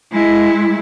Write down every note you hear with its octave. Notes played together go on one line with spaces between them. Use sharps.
G#3 E4